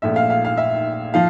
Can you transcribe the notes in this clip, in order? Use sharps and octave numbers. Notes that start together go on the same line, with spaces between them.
A#1 A#2 A3 E5
F5
F5
F5
E5
F3 F5